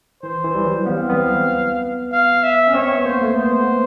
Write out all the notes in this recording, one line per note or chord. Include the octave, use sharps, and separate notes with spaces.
E3 C5
E3
G3
F#3
B3 F5
C4
B3
F5
E5
C#4
C4 C#5
B3
A#3 C5
A3
B3 C5